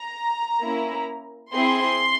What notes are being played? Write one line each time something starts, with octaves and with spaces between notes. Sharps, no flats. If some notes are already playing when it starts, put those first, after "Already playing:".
Already playing: A#5
A#3 C#4 E4
C4 E4 G#4 C6